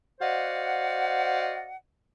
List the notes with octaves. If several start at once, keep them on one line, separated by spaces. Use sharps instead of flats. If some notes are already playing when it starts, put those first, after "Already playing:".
F#4 C5 D5 D#5 F5 F#5